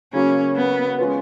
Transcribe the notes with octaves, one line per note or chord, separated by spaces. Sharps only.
C#3 F#3 A#3 C#4
B3
G#3 C#4 F4 B4